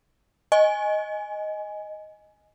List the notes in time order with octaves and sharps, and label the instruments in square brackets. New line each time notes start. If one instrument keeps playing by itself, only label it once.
[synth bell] D#5 G#5